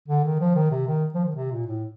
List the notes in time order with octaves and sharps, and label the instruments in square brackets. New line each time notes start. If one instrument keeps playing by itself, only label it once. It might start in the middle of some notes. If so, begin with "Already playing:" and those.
[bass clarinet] D3
D#3
F3
D#3
C3
D#3
F3
D#3
C3
A#2
A2